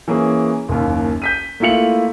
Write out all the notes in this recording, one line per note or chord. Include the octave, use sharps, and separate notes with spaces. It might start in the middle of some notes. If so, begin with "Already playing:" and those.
E3 A#3 C#4 G#4
F#1 D#2
G6 B6 D#7
A3 A#3 E4 F4 C#7 F#7